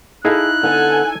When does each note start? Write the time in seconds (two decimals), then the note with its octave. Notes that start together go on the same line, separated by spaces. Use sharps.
0.25 D#4 E4 G#4 A4 F5 F#6
0.63 D3 B3 A4 F#5 G#5